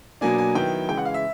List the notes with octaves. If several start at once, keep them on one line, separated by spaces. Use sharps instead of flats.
B2 F#3 A#3 D4 G#5
G#5
D#3 F#3 B3 E4 G5
C#3 E3 G#3 G5
F#5
F5
E5